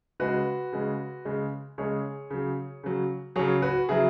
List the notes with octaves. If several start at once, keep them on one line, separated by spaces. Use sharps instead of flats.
C#3 G#3 F#4 B4
C#3 G#3
C#3 G#3
C#3 G#3 G#4 C#5
C#3 F#3
C#3 F#3
C#3 F#3 G#4 C#5
F#4 B4
C#3 F#3 E4 G#4